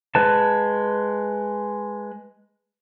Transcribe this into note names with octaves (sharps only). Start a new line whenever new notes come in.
G#3 B4 A5